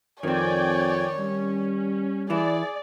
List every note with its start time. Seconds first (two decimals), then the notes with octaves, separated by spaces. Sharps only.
0.23 F2 D#3 C4 C#5 D5 G5 G#5
1.18 G3 C#4
2.30 E3 E4 G#4 D5